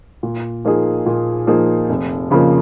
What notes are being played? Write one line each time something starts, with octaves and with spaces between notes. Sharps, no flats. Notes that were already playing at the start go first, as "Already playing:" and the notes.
A#2
F3 A#3 D#4 G#4
A#2
F3 A#3 D#4 G#4
F1
F2 C#3 F3 A#3